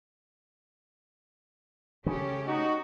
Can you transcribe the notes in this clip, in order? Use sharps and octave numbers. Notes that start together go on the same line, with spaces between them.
C#3 A3 C#4 G4
D#4 F#4